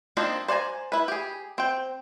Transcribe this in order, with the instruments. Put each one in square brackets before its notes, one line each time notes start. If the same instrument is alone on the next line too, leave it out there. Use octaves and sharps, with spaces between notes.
[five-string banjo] F3 A#3 C4 D4 D#4
C5 D5 F#5 G#5 A#5
E4 B4
G4 G#4
C4 G5